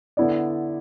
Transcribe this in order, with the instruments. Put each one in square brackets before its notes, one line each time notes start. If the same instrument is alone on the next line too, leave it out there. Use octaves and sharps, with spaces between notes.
[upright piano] D3 B3 E4 D5